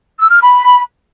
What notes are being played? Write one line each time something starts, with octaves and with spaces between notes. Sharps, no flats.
E6
F6
B5